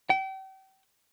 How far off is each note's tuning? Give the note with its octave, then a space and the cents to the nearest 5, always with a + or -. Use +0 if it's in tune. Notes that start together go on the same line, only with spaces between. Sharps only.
G5 -35